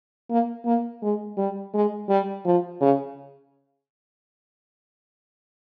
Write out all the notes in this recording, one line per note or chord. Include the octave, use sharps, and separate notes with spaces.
A#3
A#3
G#3
G3
G#3
G3
F3
C#3